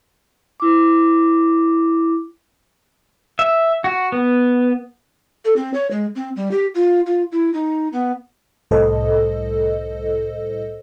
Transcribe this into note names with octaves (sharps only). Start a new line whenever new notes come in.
E4 D6
E5
F#4
B3
A4
C4
C#5
G#3
C4
G3
G4
F4
F4
E4
D#4
B3
C2 A2 A4 C5 D#5